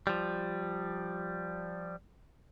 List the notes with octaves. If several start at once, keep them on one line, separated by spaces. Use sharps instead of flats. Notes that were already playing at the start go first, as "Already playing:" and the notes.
F3 G3